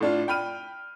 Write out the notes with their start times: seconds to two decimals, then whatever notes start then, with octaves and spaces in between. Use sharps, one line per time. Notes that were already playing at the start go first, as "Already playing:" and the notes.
0.01 A2 D4 F4
0.28 G5 B5 F6 D#7